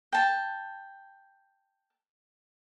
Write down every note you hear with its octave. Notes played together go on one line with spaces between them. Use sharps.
G5 A5